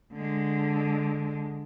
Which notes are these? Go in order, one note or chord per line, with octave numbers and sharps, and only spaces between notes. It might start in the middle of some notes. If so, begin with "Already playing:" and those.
D3 G#3